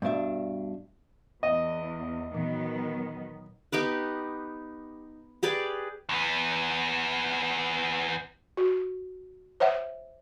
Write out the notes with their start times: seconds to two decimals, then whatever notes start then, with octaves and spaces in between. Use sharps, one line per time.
0.02 G2 B2 D4 E5
1.43 E2 D#5
2.34 A#2 D#3 E3 F#3 B3
3.72 B3 D#4 G4 B4
5.43 G4 G#4 B4 D5
6.09 E2 B3
8.57 F#4
9.60 C5 C#5 E5 F#5